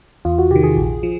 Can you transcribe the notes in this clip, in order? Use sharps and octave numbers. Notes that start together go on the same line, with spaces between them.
E2 F4
F#4
C3 D#3 G4
G#4
A#1
F3